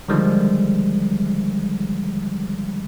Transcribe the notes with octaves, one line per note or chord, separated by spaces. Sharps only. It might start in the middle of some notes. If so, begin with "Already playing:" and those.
D3 D#3 F3 G3 G#3